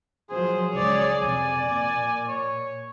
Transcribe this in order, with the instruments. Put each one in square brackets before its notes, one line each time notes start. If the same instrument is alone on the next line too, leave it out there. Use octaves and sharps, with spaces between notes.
[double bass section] F3 F#3 [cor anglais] G#4 [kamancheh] C5
[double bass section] C#2 [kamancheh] C#5 D5
[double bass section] F2 C3 [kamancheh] D5 [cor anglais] G#5
[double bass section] A#2
[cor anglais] C#5